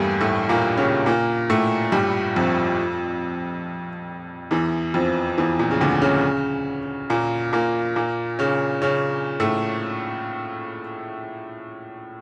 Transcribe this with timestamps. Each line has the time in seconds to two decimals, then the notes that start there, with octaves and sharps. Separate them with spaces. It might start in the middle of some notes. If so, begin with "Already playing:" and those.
Already playing: E2 G2 G3 A3 A#3
0.21 A2 A3
0.49 A#2 A#3
0.77 C#3 C#4
1.06 A#2 A#3
1.50 A2 A3
1.92 G2 G3
2.36 F2 F3
4.51 E2 E3
4.94 F2 F3
5.38 E2 E3
5.59 A#2
5.71 C#3
5.81 D2 D3
6.02 C#3 C#4
7.10 A#2 A#3
7.53 A#2 A#3
7.96 A#2 A#3
8.39 C#3 C#4
8.82 C#3 C#4
9.40 A2 A3